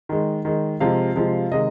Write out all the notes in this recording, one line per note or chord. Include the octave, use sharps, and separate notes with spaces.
D#3 G#3
D#3 G#3
C3 F3 G#3 F5
C3 F3 G#3
C3 D#3 G#3 D#5